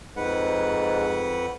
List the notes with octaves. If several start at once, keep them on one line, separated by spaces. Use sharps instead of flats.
F2 G#2 B4 F#5